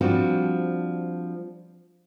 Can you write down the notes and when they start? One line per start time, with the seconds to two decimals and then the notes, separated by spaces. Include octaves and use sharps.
0.01 F3 G3 C4 D4 F#4